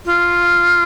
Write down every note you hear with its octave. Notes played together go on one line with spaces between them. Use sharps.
F4